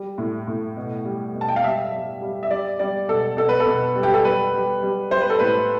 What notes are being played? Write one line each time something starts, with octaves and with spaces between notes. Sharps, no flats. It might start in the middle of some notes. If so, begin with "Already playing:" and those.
Already playing: G3
A2
A2
B2
G3
B2
A5
G5
F5
G3 E5
G3
G3
E5
G3 D5
G3 D5
B2 A4
B2 A4
B4
A4
B2
G3
G4
A4
G3 B4
G3
G3
G3 C5
B4
A4
A2 B4